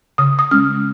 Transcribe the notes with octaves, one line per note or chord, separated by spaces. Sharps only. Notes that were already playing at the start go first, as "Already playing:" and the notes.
C#3 D#6
D#6
G#3 C#4 F6